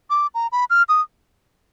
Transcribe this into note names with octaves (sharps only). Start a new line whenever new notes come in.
D6
A#5
B5
F6
D#6